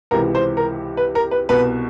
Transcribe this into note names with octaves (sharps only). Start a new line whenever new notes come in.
C#2 C3 E3 A#4
C5
A#4
B4
A#4
B4
C2 B2 B4